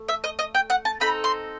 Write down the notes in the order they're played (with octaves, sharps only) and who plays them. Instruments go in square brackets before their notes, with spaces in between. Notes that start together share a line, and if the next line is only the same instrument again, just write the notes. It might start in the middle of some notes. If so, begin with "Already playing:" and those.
Already playing: [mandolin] A3
E5
D#5
D#5
G5
F#5
A5
C4 D#4 A4 B5
C6